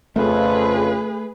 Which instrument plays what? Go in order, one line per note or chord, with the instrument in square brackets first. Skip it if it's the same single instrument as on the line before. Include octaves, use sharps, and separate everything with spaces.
[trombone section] F2 C#3 [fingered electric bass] A3 [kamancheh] G#4 B4